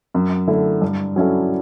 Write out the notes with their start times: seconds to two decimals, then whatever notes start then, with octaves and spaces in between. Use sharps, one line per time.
0.14 F#2
0.47 D3 A3 E4
0.82 G2
1.16 F#3 C#4 E4 A4